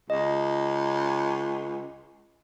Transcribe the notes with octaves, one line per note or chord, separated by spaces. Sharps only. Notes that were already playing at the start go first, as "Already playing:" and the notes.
C#2 D#5